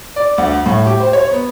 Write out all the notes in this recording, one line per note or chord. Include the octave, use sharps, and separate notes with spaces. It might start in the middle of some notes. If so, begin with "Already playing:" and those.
D5
D2
A2
G4
C5
C#5
B3